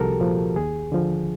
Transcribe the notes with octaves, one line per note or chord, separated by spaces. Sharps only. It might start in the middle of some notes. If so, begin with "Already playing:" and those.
Already playing: C2 F3 F#4 G4 A4 A#4
A#2 F3
D#2 G#4
D3 F3